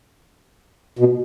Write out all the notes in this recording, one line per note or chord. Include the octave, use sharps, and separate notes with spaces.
B2